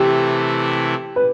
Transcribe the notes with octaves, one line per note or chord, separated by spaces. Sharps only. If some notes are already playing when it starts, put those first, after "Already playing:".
Already playing: C3 E3 A3 E4 G4
B4